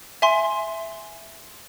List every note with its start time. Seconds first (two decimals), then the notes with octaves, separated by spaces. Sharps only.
0.22 E5 G#5 C6